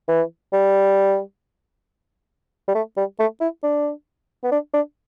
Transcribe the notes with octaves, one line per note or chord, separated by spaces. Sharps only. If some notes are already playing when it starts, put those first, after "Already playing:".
E3
G3
G3
A3
G3
A3
E4
D4
B3
D4
D4